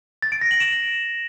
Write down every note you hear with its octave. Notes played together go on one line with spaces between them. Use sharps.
A6
D7
A#6
F#7
E7